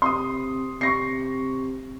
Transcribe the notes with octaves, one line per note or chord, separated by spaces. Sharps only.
C3 C6 D#6
C3 C#6 A#6 C7